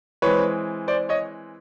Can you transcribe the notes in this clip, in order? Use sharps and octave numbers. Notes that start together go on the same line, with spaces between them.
E3 G#3 C4 B4 C#5
C5 D5
C#5 D#5